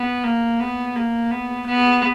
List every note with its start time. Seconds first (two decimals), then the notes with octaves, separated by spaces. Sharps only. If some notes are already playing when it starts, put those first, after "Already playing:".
Already playing: B3
0.24 A#3
0.60 B3
0.96 A#3
1.31 B3
1.67 B3